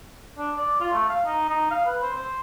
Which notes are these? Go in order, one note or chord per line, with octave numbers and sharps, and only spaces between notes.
D4
D5
F4
A3
F5
D#4
D#4
F5
B4
C5
C5